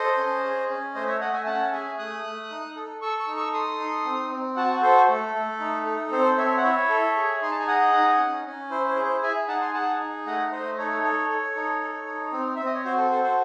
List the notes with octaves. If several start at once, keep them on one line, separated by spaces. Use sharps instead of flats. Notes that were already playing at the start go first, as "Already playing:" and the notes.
Already playing: A4 C5 D#5
C#4
G#4
C#4
A3 C5 D#5
C#5 E5
A3 D#5 F#5
E5 G#5
C#4 F#5 A5
G#4 E5 G#5
A3 D#6 F#6
A3
D#4
A4
A4 C#6 E6
C#6 E6
D#4
C#6 E6
A4 C6 D#6
D#4
C4
C4
F#4 F#5 A5
A4 C5
A3 A4
A3
D#4
A4
C4 C5
C4 C#5 E5
F#5
E4 C#5 E5
A4
G#4
D#4 C6
A5
G#5
G#4 D#5 F#5
D#4
C#4
C#4
E4 C5
C5
G#4
C5
G#4 E5 G#5
D#4 F#5 A5
G#5 C6
G#4 F#5 A5
D#4
A3 D#5 F#5
A3 C5 D#5
D#4 A4 C#5
A4
A4
D#4
A4
D#4
C4
C4 E5
D#5
C#5
F#4 C5
A4
A4 C5
C5